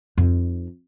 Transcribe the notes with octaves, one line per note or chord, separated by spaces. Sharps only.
F2 D#4